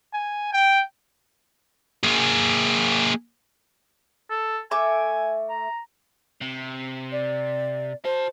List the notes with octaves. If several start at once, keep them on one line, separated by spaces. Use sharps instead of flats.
G#5
G5
A#3 G#4
A4
A3 E5 G#5 D6
A#5
C3
D5
F#4 C5 A5